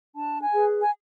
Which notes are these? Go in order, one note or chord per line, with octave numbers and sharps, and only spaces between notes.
D4 A5
G#5
G#4 B4
G#5